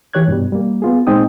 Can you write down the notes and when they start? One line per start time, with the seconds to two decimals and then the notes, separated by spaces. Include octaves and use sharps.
0.13 E3 G4 C#5 F#6 G#6
0.28 G2 B2 G3
0.52 G3 A#3
0.82 B3 F4 G#4
1.07 A#2 G#3 C4 D#4 G5 D#6